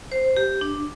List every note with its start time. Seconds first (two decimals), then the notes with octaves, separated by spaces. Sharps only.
0.12 C5
0.36 G4
0.61 D4